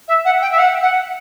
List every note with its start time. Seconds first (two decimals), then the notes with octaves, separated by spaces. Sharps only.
0.08 E5
0.25 F#5
0.41 G5
0.51 E5
0.58 F#5
0.82 F#5